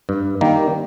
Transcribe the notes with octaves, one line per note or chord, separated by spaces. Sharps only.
G2
D#3 G3 A#3